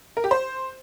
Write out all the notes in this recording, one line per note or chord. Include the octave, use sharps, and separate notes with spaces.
A#4
G4
C5